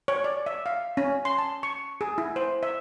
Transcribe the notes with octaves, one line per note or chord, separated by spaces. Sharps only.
C#5
D5
E5
F5
C#4
C6
A5
C#6
G#4
E4
C5
E5